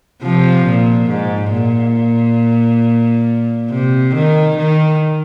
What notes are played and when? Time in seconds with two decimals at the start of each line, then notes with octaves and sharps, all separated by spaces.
0.23 C3 F3
0.66 A#2
1.09 G#2
1.53 A#2
3.71 C3
4.14 D#3
4.58 D#3